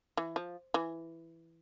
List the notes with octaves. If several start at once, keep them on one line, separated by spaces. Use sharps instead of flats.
E3
F3
E3